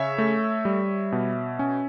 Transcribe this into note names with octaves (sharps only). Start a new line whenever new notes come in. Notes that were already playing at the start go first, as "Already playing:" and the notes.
Already playing: C#3 C#5 E5
A3
G3
B2
C#4